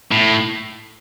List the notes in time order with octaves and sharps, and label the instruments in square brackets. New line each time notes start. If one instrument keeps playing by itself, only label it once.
[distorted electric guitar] A2